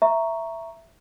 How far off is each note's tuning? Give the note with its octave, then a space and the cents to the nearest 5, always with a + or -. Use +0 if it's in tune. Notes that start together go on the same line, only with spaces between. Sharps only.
E5 +10 A#5 +0 C#6 +0